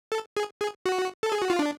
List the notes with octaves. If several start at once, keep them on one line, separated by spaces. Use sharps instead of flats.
A4
G#4
G#4
F#4
A4
G#4
F#4
F4
D4